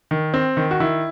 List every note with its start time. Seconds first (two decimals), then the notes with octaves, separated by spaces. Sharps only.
0.11 D#3
0.34 C4
0.57 D#3
0.71 F#4
0.80 D#3 E4